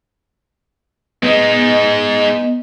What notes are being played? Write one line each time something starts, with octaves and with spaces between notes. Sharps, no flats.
G#3 B3 D#4 D#5